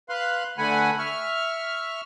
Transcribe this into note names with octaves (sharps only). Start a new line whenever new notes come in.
B4 F5 C6 F#6
D3 A3 B4 F#5 G#5 B5
E5 C#6 F6